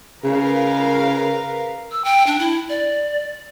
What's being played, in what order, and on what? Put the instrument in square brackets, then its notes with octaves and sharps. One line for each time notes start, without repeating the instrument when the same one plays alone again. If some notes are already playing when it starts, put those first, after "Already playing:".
[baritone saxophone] C#3 [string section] A#4 B4 F5
[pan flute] E6
G5
D4
E4
D5